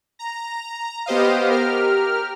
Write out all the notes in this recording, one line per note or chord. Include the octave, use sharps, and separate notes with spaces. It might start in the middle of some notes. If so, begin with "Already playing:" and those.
A#5
B3 G4 C5 D#5 F5
G4 A#4 F6